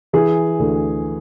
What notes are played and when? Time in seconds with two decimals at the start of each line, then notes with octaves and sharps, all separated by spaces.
0.13 E3 G#4
0.59 D2